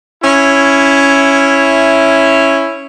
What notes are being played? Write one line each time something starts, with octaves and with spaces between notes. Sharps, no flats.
C#4 E4